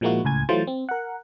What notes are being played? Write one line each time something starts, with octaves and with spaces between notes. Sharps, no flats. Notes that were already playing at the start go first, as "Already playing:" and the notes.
A#2 F3 G#3 A#3 E4 F#4
C#2 A2 G#5 G#6
E3 F#3 A3 F4 C5 A6
C4
A#4 F#5